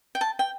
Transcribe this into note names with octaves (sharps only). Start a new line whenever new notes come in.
G5
A5
G5